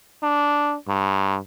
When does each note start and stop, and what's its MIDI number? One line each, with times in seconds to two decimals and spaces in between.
0.23 0.75 62
0.88 1.38 43